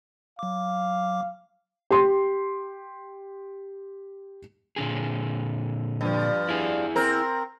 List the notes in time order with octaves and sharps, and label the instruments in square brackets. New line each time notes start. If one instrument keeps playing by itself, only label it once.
[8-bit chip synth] F#3 D6 [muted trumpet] F5
[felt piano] G4 C6
[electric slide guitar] A#2 D3 G#4
[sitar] G2 F3
[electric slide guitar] E4 G#4
[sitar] C4 A#4